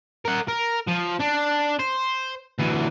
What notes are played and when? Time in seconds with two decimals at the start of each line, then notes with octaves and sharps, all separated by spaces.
0.25 A#4 F#5
0.48 A#4
0.88 F3
1.20 D4
1.79 C5
2.59 D2 E3